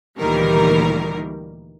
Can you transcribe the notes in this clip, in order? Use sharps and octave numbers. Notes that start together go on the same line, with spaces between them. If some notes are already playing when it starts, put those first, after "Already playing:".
D2 A#2 D#3 E3 G3 A#4